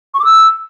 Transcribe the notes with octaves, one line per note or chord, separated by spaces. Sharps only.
C#6
D6
E6